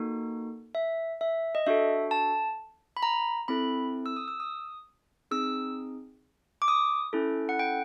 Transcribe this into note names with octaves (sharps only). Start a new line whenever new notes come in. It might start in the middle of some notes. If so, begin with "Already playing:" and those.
Already playing: A#3 D#4 F#4 A4
E5
E5
D#5
D4 F#4 A4 E5
A5
B5
A#5
C4 E4 A4 B5
E6
D#6
E6
D#6
C4 D#4 G#4 E6
D6
D#6
C#4 E4 A4
F#5
G5